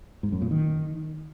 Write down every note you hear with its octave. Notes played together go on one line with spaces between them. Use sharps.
G#2
F#2
A#2
D#3